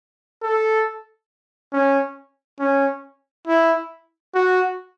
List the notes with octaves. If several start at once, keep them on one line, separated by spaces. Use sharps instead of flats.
A4
C#4
C#4
E4
F#4